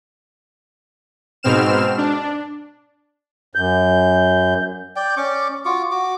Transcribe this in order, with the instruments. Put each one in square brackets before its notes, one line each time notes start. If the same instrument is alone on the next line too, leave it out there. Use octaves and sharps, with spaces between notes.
[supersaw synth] G#2 B2 C4 F6 E7
D4
[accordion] F#2 G6
[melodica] D5 G5
C#4 D5 C#6 D6
F4 F#4 C#6 D6
F#4 D6